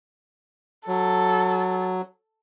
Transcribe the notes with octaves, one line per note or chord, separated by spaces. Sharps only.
F#3 A4